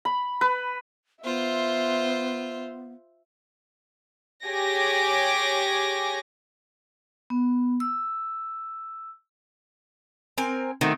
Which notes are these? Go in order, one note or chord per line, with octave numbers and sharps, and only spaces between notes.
B5
B4
B3 F4 C5 E5
G4 G#4 C#5 G#5 D6 A#6
B3
E6
C4 A#4 G#5
D#3 A3 C4 F#4